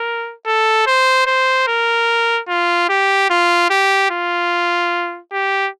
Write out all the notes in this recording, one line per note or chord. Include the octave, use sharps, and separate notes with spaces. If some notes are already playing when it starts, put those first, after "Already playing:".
Already playing: A#4
A4
C5
C5
A#4
F4
G4
F4
G4
F4
G4